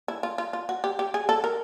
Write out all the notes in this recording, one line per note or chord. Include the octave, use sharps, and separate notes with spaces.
E4
F4
F4
F4
F#4
G4
G4
G#4
A4
A#4